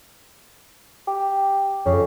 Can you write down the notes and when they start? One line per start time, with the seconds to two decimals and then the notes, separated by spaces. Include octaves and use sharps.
1.07 G4
1.86 F2 C#3